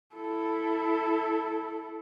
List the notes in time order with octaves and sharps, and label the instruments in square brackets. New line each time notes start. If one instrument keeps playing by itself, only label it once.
[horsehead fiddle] E4 A4